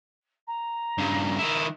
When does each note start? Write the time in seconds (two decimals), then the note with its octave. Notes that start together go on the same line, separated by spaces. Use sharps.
0.47 A#5
0.98 G2 C#3
1.39 D#3 E4